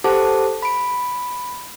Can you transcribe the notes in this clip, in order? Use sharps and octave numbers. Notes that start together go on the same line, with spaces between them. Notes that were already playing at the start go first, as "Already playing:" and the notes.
G4 A4 C5 F#5 A5 D6
B5 D7